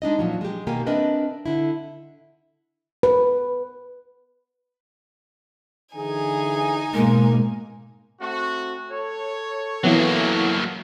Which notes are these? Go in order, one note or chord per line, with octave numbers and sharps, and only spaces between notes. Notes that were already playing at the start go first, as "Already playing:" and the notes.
G#3 D4 D#4 D#5
A#2 F3 F#3
G#3 G4
B2 D#3 A#3 G4 A#4 G#5
C4 D4 A#4 B4 D#5 E5
D3 E4
B4
D3 E3 D#4 G#4 G#5
G#2 B2 G#3 A#3
A3 C4 F#4
A4 C#5
E3 F#3 A#3 B3